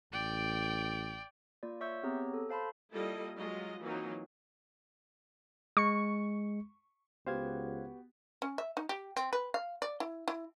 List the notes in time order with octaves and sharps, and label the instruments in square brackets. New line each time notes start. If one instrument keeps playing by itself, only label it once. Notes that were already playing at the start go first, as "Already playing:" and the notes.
[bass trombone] A1 [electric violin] D5 G5
[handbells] A#3 F4 D5
C#5 E5 C#6 E6 G6
B3 C4 G4 G#4 C#5 A#5
A4
C5 F5 A5 B5 C6
[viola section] G3 A#3 E4 F4 A4 D#5
F#3 G#3 F4 D#5
E3 F#3 A#3 C4 D#4 F4
[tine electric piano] G#3 C#7 [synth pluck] C#6
[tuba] C#2 [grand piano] B3 F#4 G4 [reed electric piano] C5 F5 G#6
[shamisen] C#4
E5
D#4
G4
C4
B4
F5
D5
E4
E4